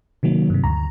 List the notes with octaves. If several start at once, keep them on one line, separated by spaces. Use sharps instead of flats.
C3 D#3 F#3 A#3
G2 C3
D2 A#5